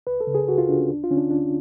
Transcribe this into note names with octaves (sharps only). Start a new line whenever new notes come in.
C#2 B4
A4
C#3
G#4
C#2 F#4
F4
C#3 D4
C#4
D2 D4
F4
D3 C#4
D4
D2 D4